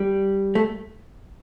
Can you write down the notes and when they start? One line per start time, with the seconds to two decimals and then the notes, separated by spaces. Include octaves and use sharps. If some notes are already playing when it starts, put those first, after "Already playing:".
Already playing: G3
0.55 A3